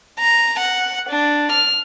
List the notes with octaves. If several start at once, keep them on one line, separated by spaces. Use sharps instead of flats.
A#5
F#5
D4
F6